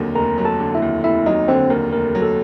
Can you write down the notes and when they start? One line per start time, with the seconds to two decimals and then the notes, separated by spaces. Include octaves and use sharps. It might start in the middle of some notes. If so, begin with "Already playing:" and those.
Already playing: F1 D#2 D3 F#3
0.15 F1 A#4 A#5
0.38 F#3
0.45 A4 A5
0.60 D3
0.75 E4 E5
0.82 D#2
1.04 F1 E4 E5
1.26 F#3 D#4 D#5
1.48 D3 C4 C5
1.70 D#2 A#4
1.93 F1 A#4
2.15 F#3
2.22 A4